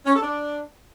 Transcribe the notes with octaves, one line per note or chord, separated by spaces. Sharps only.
C#4
A4
D4